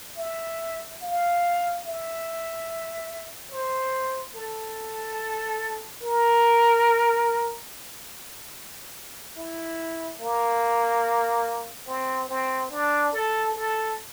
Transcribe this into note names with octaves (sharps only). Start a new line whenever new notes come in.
E5
F5
E5
C5
A4
A#4
E4
A#3
C4
C4
D4
A4
A4